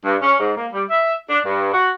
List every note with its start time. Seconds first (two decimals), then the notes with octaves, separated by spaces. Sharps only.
0.04 G2
0.21 C#4
0.38 G#2
0.56 A#3
0.72 G3
0.89 E5
1.29 D4
1.44 G2
1.72 F#4